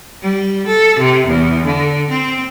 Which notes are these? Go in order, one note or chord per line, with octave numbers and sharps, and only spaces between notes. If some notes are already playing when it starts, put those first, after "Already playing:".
G3
A4
C3
E2
D3
C4